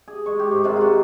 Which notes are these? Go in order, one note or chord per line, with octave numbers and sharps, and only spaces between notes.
G#4
G#3 C#6
G4
G#2
C3 D#3 G#3 F4
F4 F#4